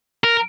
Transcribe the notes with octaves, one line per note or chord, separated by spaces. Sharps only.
A#4